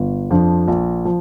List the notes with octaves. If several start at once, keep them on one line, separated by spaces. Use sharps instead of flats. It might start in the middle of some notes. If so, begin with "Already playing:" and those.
Already playing: G1
F2 F3 D4
A#1
F3